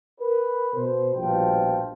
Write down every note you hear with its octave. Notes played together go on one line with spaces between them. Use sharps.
A#4 B4
B2 C5
A#1 G2 B2 F3 G5